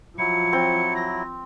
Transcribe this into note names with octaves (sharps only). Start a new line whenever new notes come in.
F3 F#3 E4 C#7
C4
A#6